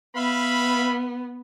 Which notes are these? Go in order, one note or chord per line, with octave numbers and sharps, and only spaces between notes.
B3 E5 F5 B5